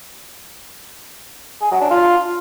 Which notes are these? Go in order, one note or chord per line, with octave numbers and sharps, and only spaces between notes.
G#4
F#3
D4
F4